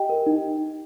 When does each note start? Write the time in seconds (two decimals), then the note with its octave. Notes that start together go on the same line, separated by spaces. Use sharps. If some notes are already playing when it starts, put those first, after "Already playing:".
Already playing: G4 D#5 G5
0.09 A#4
0.26 D#4